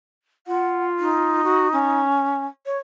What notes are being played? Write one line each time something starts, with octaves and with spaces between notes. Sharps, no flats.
F4 F#5
D#4
F#4
C#4
C#5